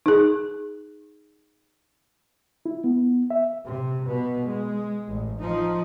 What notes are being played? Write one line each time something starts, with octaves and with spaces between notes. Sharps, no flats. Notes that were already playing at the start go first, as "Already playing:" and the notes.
D#4 G#4
E4
B3
E5
C3
B2 B3
G#3
A1
F3 D#4